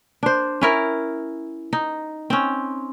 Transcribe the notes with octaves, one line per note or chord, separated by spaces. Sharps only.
D4 C5
C#4 E4 A#4
D#4
C4 C#4